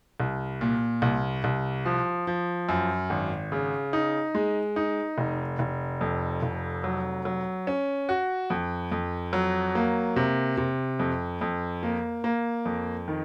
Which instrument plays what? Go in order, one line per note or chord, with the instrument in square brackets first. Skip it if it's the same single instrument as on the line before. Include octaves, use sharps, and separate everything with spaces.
[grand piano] C2
A#2
C2
C2
F3
F3
F#2
G#1
C#3
D#4
G#3
D#4
F1
F1
F2
F1
F#3
F#3
C#4
F#4
F2
F2
F#3
A#3
C3
C3
F2
F2
A#3
A#3
F2
D#3